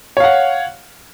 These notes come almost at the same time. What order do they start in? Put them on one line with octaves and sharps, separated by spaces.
C#5 F5 F#5